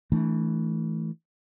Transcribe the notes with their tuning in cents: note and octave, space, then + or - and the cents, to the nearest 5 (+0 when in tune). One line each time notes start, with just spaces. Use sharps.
E3 -15 A3 +0 D4 +0